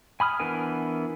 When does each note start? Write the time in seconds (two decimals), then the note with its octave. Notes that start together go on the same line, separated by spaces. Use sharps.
0.20 G#5 B5 D#6 F6
0.40 E3 B3 D4 A#4 G#5